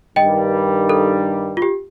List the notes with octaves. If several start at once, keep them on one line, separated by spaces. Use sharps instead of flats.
G2 D#3 G3 D#5 G5
A4
F4
G4